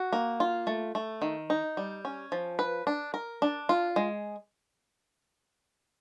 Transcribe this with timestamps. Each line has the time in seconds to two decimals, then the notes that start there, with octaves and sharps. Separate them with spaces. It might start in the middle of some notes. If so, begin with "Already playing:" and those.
Already playing: F#4
0.13 A#3
0.40 F4
0.67 A3
0.95 A3
1.22 D#3
1.50 D#4
1.77 G3
2.05 C#4
2.32 F3
2.59 B4
2.87 D4
3.14 A#4
3.42 D4
3.69 F4
3.96 G#3